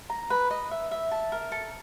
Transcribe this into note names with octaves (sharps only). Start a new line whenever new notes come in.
A#5
B4
D#5
E5
E5
A5
A#4
A4